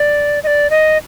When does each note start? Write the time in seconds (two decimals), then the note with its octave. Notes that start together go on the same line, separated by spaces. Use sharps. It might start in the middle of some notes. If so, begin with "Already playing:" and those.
Already playing: D5
0.43 D#5
0.47 D5
0.70 D#5